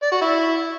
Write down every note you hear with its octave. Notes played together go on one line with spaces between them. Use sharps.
D5
F#4
E4